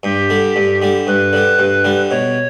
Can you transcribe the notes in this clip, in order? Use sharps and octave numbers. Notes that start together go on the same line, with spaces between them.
G2 G4
D3 G3
G2
D3 G3
G2 B4
D3 G3
G2
D3 G3
B2 C#5